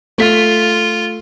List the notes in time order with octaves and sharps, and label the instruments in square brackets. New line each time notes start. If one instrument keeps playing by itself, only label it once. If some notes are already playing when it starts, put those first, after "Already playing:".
[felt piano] A3 B6 [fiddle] F4